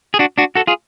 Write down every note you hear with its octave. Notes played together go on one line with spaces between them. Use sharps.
G#4
D4 F#4
D4 F#4
F#4 A4
F4 G#4